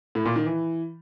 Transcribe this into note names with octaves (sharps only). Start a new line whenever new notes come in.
A2
A#2
D#3
E3